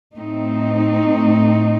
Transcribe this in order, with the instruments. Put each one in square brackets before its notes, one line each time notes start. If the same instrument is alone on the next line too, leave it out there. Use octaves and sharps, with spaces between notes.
[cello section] A2 A3 C4 D#4